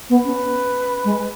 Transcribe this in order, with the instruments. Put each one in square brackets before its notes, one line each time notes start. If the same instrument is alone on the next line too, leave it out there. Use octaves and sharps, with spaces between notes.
[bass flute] B3 [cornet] B4
[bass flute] C#4
G#3